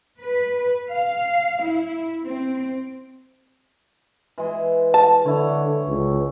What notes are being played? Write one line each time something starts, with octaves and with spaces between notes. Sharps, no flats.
B4
F5
E4
C4
E3 G#3
A5
D3 E4 C#5
C#2